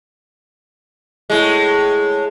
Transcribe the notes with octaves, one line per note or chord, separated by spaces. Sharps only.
A2 G#3